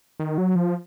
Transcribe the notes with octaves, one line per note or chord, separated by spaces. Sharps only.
D#3
F#3
F3